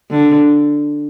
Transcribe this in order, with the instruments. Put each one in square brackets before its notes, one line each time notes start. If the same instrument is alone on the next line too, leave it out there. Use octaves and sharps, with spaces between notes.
[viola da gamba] D3